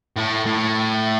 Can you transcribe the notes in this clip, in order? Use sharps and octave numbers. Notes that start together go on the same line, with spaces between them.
A2
A2